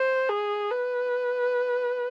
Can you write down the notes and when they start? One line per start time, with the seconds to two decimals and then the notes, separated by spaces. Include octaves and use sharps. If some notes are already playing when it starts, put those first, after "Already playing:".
Already playing: C5
0.29 G#4
0.71 B4